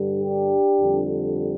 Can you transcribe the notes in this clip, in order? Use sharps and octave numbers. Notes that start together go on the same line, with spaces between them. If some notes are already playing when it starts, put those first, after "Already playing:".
Already playing: G2 D3 G3
D4 G4
F2 D3 G3